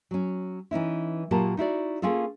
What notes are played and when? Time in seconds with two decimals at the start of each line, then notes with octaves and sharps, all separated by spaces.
0.11 F#3 C#4
0.71 E3 C#4 D#4 E4
1.31 A#2 F#3 A#3 F4 G4 A5
1.57 D#4 E4 F#4 D5
2.02 A#3 C#4 F4 G#4 A4